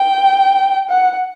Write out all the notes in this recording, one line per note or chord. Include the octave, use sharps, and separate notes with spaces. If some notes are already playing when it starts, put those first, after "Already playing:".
Already playing: G5
F#5